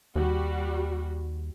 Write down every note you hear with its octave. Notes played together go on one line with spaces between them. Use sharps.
D#2 G3 F#4